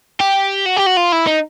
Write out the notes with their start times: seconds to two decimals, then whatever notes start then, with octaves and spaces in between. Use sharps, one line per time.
0.20 G4
0.66 F#4
0.77 G4
0.86 F#4
0.97 F4
1.12 E4
1.27 D#4